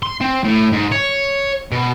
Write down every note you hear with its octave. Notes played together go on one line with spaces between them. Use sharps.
C6
C4
A2
G#2
C#5
B2